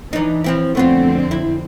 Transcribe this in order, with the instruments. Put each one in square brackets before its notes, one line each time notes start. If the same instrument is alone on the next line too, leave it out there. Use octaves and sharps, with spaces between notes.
[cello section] E3 [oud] D4 D#4
[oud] F3 C4 E4
[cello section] F2 D3 C4 [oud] A3 B3 F4
[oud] E4